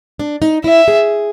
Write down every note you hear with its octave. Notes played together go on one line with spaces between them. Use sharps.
D4
D#4
E4 E5
G#4